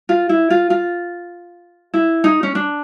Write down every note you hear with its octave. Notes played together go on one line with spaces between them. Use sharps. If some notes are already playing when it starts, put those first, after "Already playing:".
F4
E4
F4
F4
E4
D#4
C#4
D4